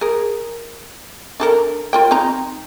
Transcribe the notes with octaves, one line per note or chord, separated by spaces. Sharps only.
G#4 A#4
D4 A4 A#4
F4 A#4 G5
C4 D#4 A#5